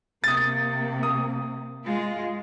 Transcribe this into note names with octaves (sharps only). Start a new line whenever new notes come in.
C3 A#3 D#6 A6
D#6
G#3 F4